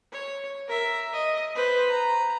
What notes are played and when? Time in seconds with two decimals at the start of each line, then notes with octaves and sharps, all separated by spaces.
0.12 C#5
0.68 A#4 E5
1.13 D#5
1.55 B4 C5
1.90 A#5